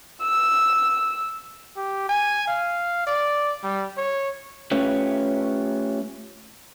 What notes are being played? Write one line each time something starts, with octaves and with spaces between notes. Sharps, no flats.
E6
G4
G#5
F5
D5
G3
C#5
A3 C#4 F4 G4 B4 C#5